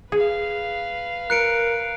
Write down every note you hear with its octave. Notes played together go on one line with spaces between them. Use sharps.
G#4 B4 F5
A#4 F#6 C#7 D7